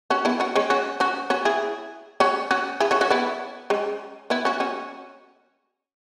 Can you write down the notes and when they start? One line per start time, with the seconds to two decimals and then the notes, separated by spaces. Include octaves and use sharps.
0.10 C#4 F#4
0.25 B3 E4
0.40 C#4 F#4
0.55 G#3 C#4
0.70 C#4 F#4
1.00 C#4 F#4
1.30 C#4 F#4
1.45 E4 G#4
2.20 C#4 F#4
2.51 C#4 F#4
2.80 E4 G#4
2.91 C#4 F#4
3.01 C#4 F#4
3.10 B3 E4
3.70 G#3 C#4
4.30 B3 E4
4.45 C#4 F#4
4.60 C#4 F#4